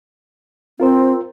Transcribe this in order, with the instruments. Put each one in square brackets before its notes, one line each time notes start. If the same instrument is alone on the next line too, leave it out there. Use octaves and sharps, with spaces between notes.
[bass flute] C4 [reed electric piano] F4 A#4 C5